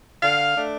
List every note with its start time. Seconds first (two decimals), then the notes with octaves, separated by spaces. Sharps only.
0.22 D3 F5
0.56 A3 D4